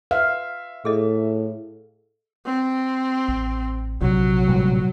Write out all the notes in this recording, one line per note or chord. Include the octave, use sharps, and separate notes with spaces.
B4 E5 F5
A2 G#4 A4 D#5
C4
A1
A#1 C3 F#3
A1 A#2 G3